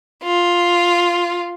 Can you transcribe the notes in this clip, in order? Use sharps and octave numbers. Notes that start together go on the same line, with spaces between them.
F4